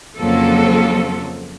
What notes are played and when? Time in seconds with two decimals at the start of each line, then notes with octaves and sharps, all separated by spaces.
0.18 F2 C#3 F3 F#3 A#3 A4